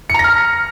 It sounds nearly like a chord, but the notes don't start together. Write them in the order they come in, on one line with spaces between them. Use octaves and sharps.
C#7 A#5 A#6 F6